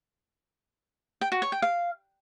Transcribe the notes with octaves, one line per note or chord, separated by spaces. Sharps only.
G5
F#4
C#5
G5
F5